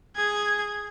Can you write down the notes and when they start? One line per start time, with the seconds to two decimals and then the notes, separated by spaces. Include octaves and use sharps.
0.15 G#4 G#6